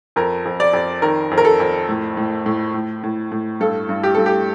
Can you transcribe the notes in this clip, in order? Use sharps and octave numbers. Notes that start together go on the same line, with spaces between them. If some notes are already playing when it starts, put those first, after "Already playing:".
F2 A#4
F2
D5
F2
D#3 A#4
F2
A#4
A4
F2
A2
A2
A2
A2
A2
A2
G2 A4
G2
G4
G2 A4
G4